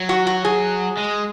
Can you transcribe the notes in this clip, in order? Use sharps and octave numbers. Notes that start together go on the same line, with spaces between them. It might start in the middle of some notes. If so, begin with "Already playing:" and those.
Already playing: F#3
F#4
F#4
G#4
G#3